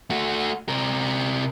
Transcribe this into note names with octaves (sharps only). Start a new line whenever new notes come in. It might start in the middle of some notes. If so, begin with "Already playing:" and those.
A3 F#4
C3 A#4